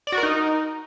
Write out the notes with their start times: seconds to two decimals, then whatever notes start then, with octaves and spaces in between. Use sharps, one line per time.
0.07 D5
0.12 F#4
0.18 A#4
0.23 D#4